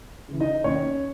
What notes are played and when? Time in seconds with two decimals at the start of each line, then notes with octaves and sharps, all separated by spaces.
0.29 C#3 E3
0.40 D#4 D#5
0.64 D#2 C#4 C#5